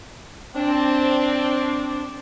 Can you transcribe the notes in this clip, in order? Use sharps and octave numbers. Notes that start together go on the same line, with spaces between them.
C4 D4